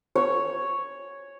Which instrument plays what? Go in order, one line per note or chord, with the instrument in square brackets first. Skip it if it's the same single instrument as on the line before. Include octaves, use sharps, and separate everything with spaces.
[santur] C#5